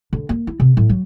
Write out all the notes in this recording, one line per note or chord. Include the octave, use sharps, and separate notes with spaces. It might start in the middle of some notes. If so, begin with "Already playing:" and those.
D3
A#3
E4
C3
A2 F#3
F#3